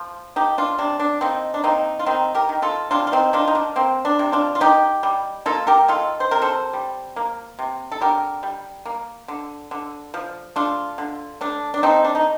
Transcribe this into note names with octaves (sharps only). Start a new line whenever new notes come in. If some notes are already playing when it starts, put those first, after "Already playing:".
Already playing: F3
A3 D#4 G4
D4 F4
C3 D4
D4
A#3 C4 D#4
D4
A#3 C4 D#4
F4
D#3 C4 D#4
G4 A#4
D#3
F4 A4
C3 D4 F4
F4
C4 D#4
D#3 D4 F4
D#4
D4
A#3 C4
D4
C3
D4 F4
F4
D#3 D#4 G4
G3
A#3 F4 A4
G4 A#4
D#3 F4 A4
C5
C3 A#4
A4 C5
G3
A#3
C3
A4
D3 G4 A#4
G3
A#3
D3
D3
F3
A3 D4 F4
D3
A3 D4
D4
A3 C4 D#4
D4
D#4